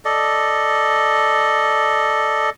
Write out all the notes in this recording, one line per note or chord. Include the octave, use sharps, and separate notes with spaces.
A4 D5 D#5